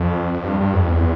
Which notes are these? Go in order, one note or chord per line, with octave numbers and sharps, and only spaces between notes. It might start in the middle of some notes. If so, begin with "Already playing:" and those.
Already playing: F2
F2
G2
G2
F2
E2